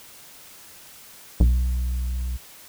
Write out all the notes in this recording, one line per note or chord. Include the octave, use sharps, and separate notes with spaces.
B1